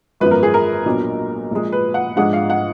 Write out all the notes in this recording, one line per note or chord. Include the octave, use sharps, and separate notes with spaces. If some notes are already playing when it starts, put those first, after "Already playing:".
G#1 F#2 F3 B3 B4
A#4
G#4
A#4
B1 A#2 F#3 D4
A#1 A#2 G#3
B4
F#5
G#2 F3 G#3 D4 F#5
F5
F#5